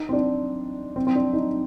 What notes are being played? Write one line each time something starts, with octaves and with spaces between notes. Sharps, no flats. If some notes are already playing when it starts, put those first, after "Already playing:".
Already playing: D#4
C4
D4
C4
C4
D4
D#4